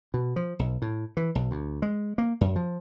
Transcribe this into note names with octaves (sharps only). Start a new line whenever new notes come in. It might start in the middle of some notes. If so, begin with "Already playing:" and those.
B2
F3
B1
A2
E3
B1
D2
G#3
A#3
F#2
F3